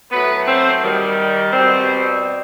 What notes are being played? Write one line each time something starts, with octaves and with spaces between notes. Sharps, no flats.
A2 F#3 A3 B3 B4
C4 C5
D#3 G3
B2 G3 C4 C5